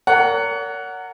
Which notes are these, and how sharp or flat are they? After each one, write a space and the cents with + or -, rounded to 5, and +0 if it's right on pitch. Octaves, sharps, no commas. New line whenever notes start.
A#4 -20 C#5 +45 F#5 +0